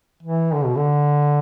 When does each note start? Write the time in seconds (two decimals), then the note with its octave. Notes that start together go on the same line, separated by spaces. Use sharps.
0.23 E3
0.54 D3
0.65 B2
0.76 D3